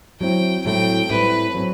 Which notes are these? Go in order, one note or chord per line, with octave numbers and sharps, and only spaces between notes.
F#3 C4 E4 G5
A2 F#3 A3 C4 E4 G5
A2 G3 C4 E4 B4
F#3 C4